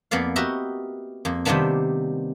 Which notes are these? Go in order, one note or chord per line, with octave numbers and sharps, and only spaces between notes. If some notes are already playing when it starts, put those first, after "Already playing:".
F2 A#3 B3 D5 F5
F#4 G4 A#4 B4 D#5 E5
F2 A#3
C3 D#3 G3 A#3 B3 D4